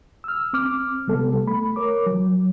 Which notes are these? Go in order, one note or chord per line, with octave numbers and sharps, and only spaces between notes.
E6 F6
C4 D6 F6
C3 G3 B3 A4
A3 B5
A#4 C#5 D6
F#3